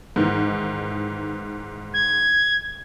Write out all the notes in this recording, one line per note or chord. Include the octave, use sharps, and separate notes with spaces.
G#2 D#3 E3
G#6